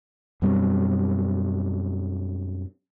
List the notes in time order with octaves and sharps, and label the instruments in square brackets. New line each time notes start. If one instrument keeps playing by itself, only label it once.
[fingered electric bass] F#2 B2 G3 C4